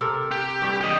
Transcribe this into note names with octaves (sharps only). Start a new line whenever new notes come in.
C3 A4 A#4
G4
G2 G3
G4 D#5